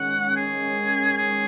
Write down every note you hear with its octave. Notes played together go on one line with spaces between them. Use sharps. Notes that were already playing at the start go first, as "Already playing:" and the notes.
Already playing: D#3 G#3 C#4 F#5
G#4
G#4